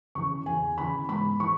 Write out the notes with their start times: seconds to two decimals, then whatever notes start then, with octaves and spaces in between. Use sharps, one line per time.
0.15 C#3 E3 C#6
0.46 E2 G#5
0.78 C#3 E3 B5
1.09 G#2 B5
1.40 E3 C#6